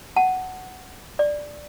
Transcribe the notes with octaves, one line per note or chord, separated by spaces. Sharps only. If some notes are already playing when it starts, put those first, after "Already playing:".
F#5 A5
D5